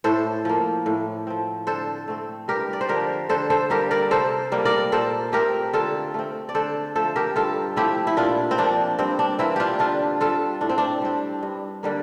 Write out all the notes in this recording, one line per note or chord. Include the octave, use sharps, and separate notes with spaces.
A2 A4 C5
F3 A#3
A2
F3 C4
D3 A4 C5
A3 C4
G2 G4 A#4
D5
C5
D3 F3 G4 A#4
D3 A4 C5
A4 C5
G3 A#3 G4 A#4
A#4 D5
C3 A4 C5
G3 A#3
A#4 D5
A#2 A4 C5
A3 C4 G4 A#4
D3 F4 A4
A3 C4
D5
D3 A4 C5
F3 A3 A4 C5
G4 A#4
G2 F4 A4
F3 A3 C4 E4 G4
E4
A#2 D4 F4
C4
F3 A#3 D4
G2 C4
D4
E3 A#3 C4 E4
D4 F4 G4
D3 D4 F4
G3 C4 F4 A4
A2 D4
C4
D4
G3 C4
G2
D3 G3 A#3